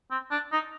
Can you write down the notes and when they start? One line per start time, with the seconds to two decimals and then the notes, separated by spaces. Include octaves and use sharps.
0.11 C4
0.31 D4
0.52 D#4